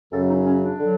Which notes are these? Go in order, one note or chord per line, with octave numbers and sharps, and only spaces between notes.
F#2 C#3 F#3 A4
D#4
C#4
D4
D3 F#3